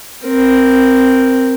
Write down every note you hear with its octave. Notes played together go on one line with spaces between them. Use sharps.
C4 A#4